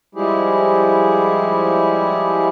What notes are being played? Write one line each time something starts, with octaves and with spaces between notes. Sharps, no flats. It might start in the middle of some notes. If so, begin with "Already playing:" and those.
F3 G3 G#3 E4 G4 G#4